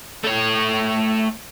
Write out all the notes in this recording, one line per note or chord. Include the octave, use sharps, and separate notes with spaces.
A3 C#5